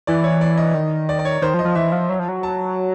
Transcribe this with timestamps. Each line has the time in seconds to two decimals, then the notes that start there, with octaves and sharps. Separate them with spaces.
0.07 E3 D5
0.24 C#5
0.41 D5
0.58 D#5
0.74 D#3
1.09 D5
1.19 D5
1.25 C#5
1.42 D#3 C5
1.54 F3
1.59 D#5
1.65 F3
1.75 E3 E5
1.92 F3
2.09 F#3
2.19 F3
2.29 F#3
2.43 A5